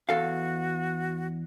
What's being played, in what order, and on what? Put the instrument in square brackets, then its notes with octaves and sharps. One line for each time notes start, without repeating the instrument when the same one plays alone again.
[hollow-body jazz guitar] E2 A4 F5 [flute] F#4